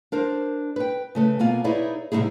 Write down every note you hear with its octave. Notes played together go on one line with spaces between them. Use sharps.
D4 A#4 C5
B4 G5
C#3 A3 B4
B2 A#3 F4 G#5
D#4 E4 G#4 B4 C#5 D5
C3 G3 A3 D#4 E4 G#4